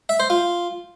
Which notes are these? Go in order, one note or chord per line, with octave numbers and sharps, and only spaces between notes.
E5
C5
F4